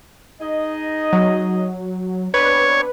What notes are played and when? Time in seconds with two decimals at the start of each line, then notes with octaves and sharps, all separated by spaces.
0.41 D#4 G#4 D#5
1.13 F#3
2.34 B3 C4 D4 B4 C#5